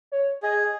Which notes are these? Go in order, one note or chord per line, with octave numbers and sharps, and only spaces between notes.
C#5
G#4 D#5